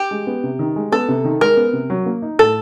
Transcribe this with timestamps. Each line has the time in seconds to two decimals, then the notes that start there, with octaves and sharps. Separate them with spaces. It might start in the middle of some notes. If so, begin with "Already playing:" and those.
Already playing: G4
0.11 G#3
0.27 B3
0.44 C3
0.59 D#3
0.76 G#3
0.92 B3 A4
1.08 C3
1.25 D#3
1.41 G#3 A#4
1.57 B3
1.73 C3
1.90 F#3
2.06 A#3
2.22 D#4
2.39 A2 A4